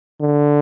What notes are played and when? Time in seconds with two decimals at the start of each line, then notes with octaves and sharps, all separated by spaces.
0.21 D3